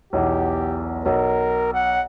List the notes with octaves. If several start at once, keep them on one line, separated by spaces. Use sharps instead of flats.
B1 E2 G4
B1 A#4
F#5